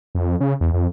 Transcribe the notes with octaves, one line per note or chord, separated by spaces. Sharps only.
F2
C#3
E2
F2